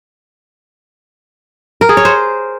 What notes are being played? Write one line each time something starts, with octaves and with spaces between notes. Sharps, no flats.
A#4
G#4
C#5
C5